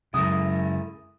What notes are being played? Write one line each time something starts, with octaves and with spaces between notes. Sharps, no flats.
F#2 C#3 G#3 E4 A4 A#4 D#6